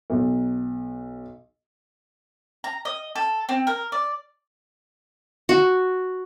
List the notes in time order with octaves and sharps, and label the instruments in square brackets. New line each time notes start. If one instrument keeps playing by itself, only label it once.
[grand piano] B1
[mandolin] A#5
D#5
A4
C4
A#4
D5
[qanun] F#4